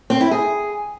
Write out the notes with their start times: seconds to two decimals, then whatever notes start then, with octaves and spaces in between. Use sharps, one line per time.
0.10 C4
0.21 E4
0.31 G#4